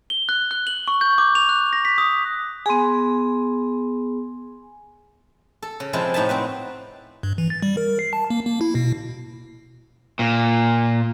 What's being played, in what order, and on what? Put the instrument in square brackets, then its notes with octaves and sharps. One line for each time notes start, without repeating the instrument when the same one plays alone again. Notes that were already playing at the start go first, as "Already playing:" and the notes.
[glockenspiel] G7
F#6
F#6
F#7
C#6
G6
D6
F7
F#6
A#6
B6
D#6
[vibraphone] B3 G#4 [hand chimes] G#5 C6
[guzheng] A4
C#3
C3 F3 G#3 E4 A5
A2 D#4 E5 A5
C4 F#4 B4
[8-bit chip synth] G2
E3
A6
G3
A#4
C7
A5
A#3
A#3
E4
B2
[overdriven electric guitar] A#2